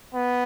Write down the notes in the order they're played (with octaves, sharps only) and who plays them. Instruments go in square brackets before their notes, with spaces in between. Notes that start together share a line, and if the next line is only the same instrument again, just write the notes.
[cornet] B3